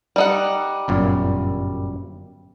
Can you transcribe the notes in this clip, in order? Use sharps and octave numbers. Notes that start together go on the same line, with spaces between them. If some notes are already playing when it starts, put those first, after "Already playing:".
G3 D#4 F#5
G1 F#2 A#2